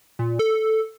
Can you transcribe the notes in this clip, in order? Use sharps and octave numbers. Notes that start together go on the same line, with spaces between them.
A#2
A4